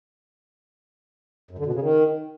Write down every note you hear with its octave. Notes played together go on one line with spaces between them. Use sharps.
F#2
D3
B2
C#3
D#3